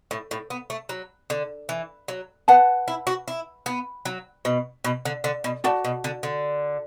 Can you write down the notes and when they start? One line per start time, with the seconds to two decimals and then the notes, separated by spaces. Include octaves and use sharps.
0.11 A2
0.31 A2
0.50 B3
0.70 A3
0.89 F#3
1.30 D3
1.69 E3
2.08 F#3
2.48 B3 B4 F#5 A5
2.88 E4
3.07 F#4
3.28 E4
3.66 B3
4.05 F#3
4.45 B2
4.84 B2
5.05 D3
5.24 D3
5.44 B2
5.64 A2 F#4 D5 F#5 A5
5.84 B2
6.04 D3
6.23 D3